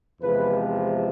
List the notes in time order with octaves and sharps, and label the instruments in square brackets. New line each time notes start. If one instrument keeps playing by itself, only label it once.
[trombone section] E2 C3 F3 G#3 B4